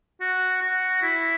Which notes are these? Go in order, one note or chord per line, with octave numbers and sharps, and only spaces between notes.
F#4
F#4
E4